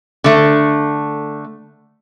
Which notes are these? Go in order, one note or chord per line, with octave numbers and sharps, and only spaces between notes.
D3 A3